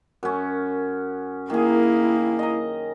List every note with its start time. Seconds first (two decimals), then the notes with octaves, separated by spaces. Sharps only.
0.23 F#2 C#4
1.50 D#3 A#3 E4 G#4
2.39 D#5 A#5